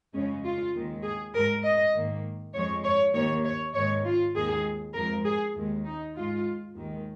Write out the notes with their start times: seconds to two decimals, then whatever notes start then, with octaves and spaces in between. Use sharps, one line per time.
0.14 F2 C#3 G#3 C#4
0.44 F4
0.73 D#2 D#3 G#3
1.03 G#4
1.34 G#2 G#3 A#4
1.64 D#5
1.94 G#2 D#3 A#3
2.54 F2 F3 G#3 C#5
2.84 C#5
3.14 D#2 D#3 A#3 C#5
3.45 C#5
3.74 G#2 D#3 G#3 C#5
4.04 F4
4.35 D#2 D#3 G#3 G#4
4.94 F2 F3 G#3 A#4
5.25 G#4
5.55 D#2 D#3 G#3
5.85 D#4
6.15 G#2 G#3 F4
6.75 D#2 D#3 G#3